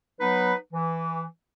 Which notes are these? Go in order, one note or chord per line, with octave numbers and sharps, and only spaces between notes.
F#3 B3 D#4 B4
E3